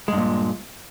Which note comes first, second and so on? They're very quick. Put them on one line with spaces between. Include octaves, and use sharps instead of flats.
G#3 G2 A#2